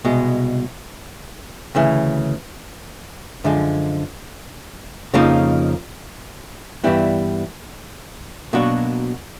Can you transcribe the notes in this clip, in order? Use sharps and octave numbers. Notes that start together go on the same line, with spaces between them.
C2 B2 G#3
D2 C#3 E3
F#2 D3 F3 G#3
F2 C#3 F3 A#3 D#4
G2 E3 G3 B3 E4
B2 F#3 A#3 D4 F#4